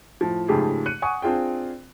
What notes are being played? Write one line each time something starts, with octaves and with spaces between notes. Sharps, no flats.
A2 F3
G#2 C#3 F3 A3 G4 G#4
F#6 C#7 D#7
F#5 G#5 C#6 D#6
C4 D4 F4 G#4 G5